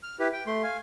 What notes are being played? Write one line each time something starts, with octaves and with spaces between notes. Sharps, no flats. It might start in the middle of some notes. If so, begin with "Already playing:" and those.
F6
E4 G4 B4
G5
A3 C6
F5 G#5